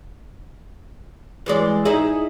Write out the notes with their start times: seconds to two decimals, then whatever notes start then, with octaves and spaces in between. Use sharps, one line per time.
1.46 E3 G#3 D5
1.85 D#4 E4 G#4